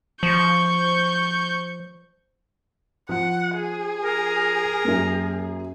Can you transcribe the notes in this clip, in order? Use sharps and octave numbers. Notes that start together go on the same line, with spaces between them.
F3 C#6 G6
F3 F#5
G#4
A#4
F#2 A#3